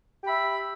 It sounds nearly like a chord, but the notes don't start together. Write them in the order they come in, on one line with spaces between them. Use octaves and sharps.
G4 B5 E5